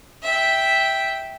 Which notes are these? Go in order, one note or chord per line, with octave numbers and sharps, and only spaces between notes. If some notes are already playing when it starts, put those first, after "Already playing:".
E5 G5